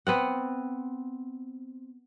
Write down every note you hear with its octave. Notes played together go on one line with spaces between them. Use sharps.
B3 C4 F#5